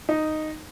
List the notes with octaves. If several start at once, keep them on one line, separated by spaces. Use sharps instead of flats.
D#4